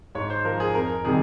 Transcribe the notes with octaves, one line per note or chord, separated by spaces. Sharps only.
G#2 C#5
C5
F3 A#4
G#4
F2 A#4
C3 D#3 G3 G#4